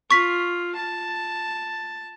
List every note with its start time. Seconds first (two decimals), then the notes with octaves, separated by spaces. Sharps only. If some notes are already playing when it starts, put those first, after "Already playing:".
0.11 F4 C#6 B6
0.75 A5